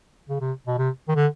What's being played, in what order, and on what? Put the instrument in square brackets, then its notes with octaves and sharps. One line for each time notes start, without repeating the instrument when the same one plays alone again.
[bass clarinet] C#3
C3
B2
C3
D#3
D3